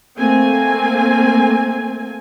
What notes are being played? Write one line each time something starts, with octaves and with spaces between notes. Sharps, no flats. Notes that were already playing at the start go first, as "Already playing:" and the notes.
A3 A#3 C4 G#5